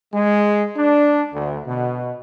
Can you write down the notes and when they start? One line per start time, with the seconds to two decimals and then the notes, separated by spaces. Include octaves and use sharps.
0.13 G#3
0.76 D4
1.33 D2
1.65 B2